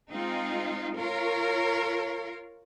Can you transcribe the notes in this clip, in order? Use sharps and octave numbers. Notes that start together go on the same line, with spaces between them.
G#3 C4 D#4 F4
F4 A#4 C#5